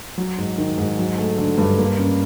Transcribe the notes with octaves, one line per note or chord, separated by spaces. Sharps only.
F#3
G#2
D#3
G#2
F#3
A3
D3
G2
A#3
C#4